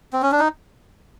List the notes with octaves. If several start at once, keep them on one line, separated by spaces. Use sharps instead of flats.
C4
C#4
D4
D#4